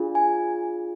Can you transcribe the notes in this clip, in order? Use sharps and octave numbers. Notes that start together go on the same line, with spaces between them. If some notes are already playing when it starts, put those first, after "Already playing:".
Already playing: D4 F4 G#4
G#5